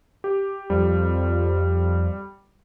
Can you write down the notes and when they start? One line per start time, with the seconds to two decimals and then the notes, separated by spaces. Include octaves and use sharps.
0.24 G4
0.70 F2 G3